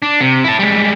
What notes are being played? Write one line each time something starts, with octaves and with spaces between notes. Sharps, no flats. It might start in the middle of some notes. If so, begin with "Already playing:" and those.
D4
C3
E4 A5
G3 G#3